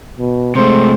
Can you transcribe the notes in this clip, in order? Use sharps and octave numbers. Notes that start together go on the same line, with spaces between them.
B2
C3 G#3 A3 C5